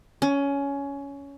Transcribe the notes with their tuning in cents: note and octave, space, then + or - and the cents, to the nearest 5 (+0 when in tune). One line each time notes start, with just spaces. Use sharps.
C#4 +15